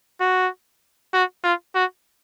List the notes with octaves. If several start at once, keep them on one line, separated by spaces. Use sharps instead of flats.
F#4
F#4
F4
F#4